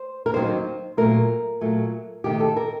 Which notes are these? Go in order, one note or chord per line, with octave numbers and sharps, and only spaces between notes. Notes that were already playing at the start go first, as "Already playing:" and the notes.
Already playing: C5
A#4
D#2 D#3 F#3 C4 D#4 C5
A#2 F#3 A3 A#4
A#2 F#3 A3
C3 D#3 A3 D#4 G4
A4
A#4